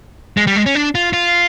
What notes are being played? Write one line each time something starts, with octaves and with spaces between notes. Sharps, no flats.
G#3
G3
G#3
C#4
D4
F4
F4